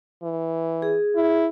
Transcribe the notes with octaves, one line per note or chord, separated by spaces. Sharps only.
E3
G#4
E4